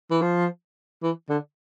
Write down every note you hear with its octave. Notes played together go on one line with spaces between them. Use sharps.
E3
F3
E3
D3